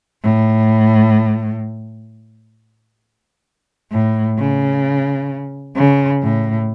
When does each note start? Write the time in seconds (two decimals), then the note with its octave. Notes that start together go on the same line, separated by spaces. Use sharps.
0.24 A2
3.92 A2
4.38 C#3
5.76 C#3
6.22 A2